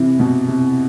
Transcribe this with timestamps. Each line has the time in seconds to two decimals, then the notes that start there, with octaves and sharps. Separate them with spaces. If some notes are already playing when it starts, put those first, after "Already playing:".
Already playing: C3 E3
0.20 B2
0.48 C3